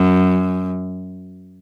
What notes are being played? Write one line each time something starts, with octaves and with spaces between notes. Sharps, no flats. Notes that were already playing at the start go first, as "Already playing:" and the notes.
Already playing: F#2